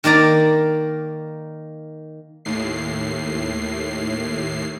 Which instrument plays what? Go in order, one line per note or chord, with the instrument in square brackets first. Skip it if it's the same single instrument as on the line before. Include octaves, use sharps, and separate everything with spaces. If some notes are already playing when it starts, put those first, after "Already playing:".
[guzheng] D#3 A#3 D5 A#5
[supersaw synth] D#2 A2 C7